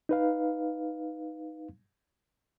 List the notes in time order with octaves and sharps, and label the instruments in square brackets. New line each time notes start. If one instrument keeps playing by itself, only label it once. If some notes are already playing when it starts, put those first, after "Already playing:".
[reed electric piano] D#4 B4 F5